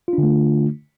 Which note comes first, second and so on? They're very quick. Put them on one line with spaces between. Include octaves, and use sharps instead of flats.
F4 D4 D3 A3